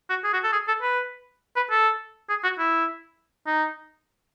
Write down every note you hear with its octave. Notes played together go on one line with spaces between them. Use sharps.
F#4
G#4
F#4
A4
G#4
A4
B4
B4
A4
G#4
F#4
E4
D#4